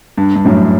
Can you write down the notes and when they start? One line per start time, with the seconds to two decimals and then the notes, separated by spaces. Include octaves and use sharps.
0.18 G2
0.36 G2
0.45 F#2 A2